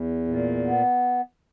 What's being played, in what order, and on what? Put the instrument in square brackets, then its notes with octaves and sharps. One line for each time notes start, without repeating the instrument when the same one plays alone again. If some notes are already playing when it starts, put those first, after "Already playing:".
Already playing: [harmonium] E2
A#2
B3